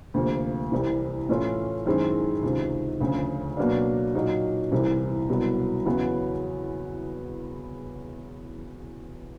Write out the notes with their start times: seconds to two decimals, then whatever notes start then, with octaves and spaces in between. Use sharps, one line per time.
0.14 D2 C3 F3 A#3
0.72 C2 C3 E3 G3
1.29 A2 E3 A3 C#4 F4
1.86 F#2 D#3 G#3 C4 E4
2.43 C#2 C3 D#3
3.00 D2 C#3 F3
3.57 B2 F#3 A#3 D4
4.15 A#2 F#3 A#3 D#4
4.72 C2 C3 E3
5.30 C2 B2 F#3 B3
5.86 E2 C#3 F#3 B3 E4